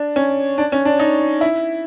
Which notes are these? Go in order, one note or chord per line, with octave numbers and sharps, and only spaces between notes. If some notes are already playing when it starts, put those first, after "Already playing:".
Already playing: D4
C#4
D4
C#4
D4
D#4
E4